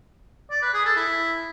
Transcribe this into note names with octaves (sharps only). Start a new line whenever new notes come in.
D5
B4
G#4
A4
E4